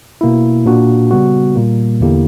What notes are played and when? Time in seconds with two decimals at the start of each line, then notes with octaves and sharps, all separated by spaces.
0.21 B2 A#3 E4
0.66 A#2 A#3 D4 F#4
1.11 C#3 G3 B3 F#4
1.55 A#2 G3 A#3
2.00 E2 D3 A#3 E4 G4